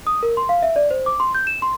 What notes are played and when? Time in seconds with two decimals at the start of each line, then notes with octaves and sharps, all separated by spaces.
0.07 D#6
0.23 A#4
0.37 C6
0.49 F5
0.62 E5
0.76 D5
0.91 C5
1.06 D6
1.20 C6
1.35 G6
1.47 E7
1.62 C6